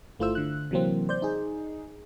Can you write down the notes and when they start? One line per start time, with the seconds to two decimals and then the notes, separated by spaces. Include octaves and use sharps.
0.19 G1 A3 E4 F4 C5 E6
0.35 D3 F#6
0.71 C3 E3 F#3 A#3 C4
1.09 C5 D5 G6
1.22 D#4 G#4